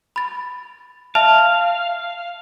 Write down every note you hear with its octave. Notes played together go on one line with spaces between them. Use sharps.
B5 A6
E5 F5 A5